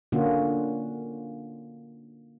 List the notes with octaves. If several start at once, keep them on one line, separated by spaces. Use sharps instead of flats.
D3 A#3 C#4 F4 F#4